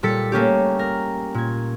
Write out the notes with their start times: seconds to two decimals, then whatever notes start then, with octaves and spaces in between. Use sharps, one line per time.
0.03 A#2 G3 A4 B6 C#7
0.32 A3 A#3 C#4 G4
0.79 A#4
1.34 A#2 G#6